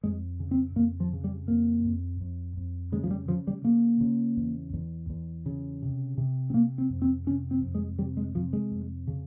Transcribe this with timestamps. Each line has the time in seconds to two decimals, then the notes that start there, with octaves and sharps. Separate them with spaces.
0.03 F2 G#3
0.40 C#3
0.51 C4
0.76 F2 A#3
1.00 F3
1.13 C#3
1.24 G3
1.48 F2 A#3
1.85 F2
2.21 F2
2.57 F2
2.92 C#3 G#3
3.04 F3
3.11 G3
3.28 C#3 F3
3.47 G3
3.64 C#3 A#3
4.01 C#3
4.37 E2
4.73 E2
5.10 E2
5.46 C#3
5.82 C3
6.18 C3
6.50 C4
6.54 C3 A#3
6.78 C4
6.90 F2
7.02 C4
7.26 C3 C#4
7.51 C4
7.62 F2
7.75 G#3
7.99 C3 G3
8.17 G#3
8.35 C3 F3
8.53 G#3
8.71 F2
9.07 C#3